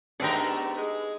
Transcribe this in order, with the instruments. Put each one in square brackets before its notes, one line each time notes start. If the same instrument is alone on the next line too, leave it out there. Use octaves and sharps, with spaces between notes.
[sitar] A3 B3 A#4 [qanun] D4 F#5 [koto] D#4 G4 G#4
[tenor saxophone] G#3